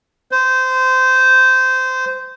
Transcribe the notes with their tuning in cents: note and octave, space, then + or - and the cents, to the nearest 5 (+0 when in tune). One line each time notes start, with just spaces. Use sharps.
C5 -20